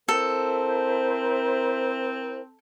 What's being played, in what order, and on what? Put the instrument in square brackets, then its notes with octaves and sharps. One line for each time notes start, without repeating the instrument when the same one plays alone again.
[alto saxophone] C4 [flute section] E4 A#4 C5 [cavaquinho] A4